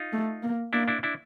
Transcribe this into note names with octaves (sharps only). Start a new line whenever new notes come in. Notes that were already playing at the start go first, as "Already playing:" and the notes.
Already playing: D#4 F4
A3
A#3
A#3 D4 E4
D4 E4
D4 E4